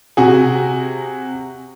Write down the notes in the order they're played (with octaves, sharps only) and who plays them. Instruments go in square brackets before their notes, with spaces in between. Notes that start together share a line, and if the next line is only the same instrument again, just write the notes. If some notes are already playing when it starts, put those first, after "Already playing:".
[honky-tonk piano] C3 F#4 G#4